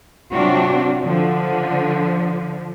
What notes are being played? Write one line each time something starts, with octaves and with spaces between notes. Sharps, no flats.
C3 F#3 C4 D4 F4 F#4
D3 F3